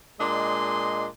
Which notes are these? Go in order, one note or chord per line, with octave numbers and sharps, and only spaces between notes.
A#2 G#3 D4 D#5 C6